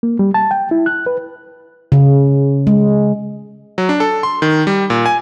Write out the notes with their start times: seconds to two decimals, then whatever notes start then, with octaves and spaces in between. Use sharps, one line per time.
0.03 A#3
0.19 G3
0.34 A5
0.51 G5
0.71 E4
0.86 F#6
1.06 B4
1.92 C#3
2.67 G#3
3.78 F#3
3.89 D4
4.00 A4
4.23 C6
4.42 D#3
4.67 G3
4.90 A#2
5.06 G#5